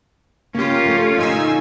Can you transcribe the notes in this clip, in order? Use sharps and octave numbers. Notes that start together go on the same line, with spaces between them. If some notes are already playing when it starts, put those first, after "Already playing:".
C#3 A#3 C#4 F4 G4
A3 A4
D2 A#2 D#4 G#4 G#5 E6